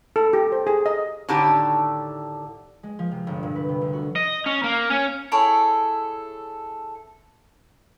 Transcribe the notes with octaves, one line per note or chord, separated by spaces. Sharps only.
A4
G4
C5
G#4
D#5
A2 D3 D#3 A3 G4
G#3
F3
C3
G1
A#2
B4
C3
D2
F#4
D#5
C#4
A#3
C#4
E4 G#4 A4 C#5